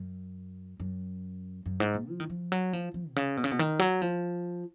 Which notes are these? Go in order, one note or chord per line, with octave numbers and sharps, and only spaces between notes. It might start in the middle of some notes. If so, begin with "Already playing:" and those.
Already playing: F#2
F#2
F#2
G#2
A#2
F3
D#3
F3
F#3
F3
F3
B2
C#3
B2
C#3
B2
D#3
F#3
F3